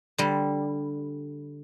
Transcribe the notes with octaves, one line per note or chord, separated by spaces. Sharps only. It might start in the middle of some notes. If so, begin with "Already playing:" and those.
D3 G3